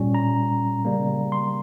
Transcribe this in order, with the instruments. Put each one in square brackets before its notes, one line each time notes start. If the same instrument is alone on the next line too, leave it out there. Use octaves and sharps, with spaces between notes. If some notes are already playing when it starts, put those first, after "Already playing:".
Already playing: [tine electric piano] A#2 G3 C#4
A#5
C#3 G3 A#3
C6